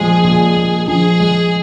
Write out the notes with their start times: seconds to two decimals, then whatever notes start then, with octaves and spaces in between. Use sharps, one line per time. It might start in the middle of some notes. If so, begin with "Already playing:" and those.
Already playing: A#2 F3 G#3 G#4
0.24 A#2
0.57 A#2
0.88 F3 G#4
1.20 G#3